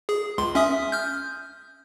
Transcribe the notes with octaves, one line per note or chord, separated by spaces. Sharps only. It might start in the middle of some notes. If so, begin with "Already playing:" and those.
G#4
C#2 C6
C#4 E5 D#6
F6 G6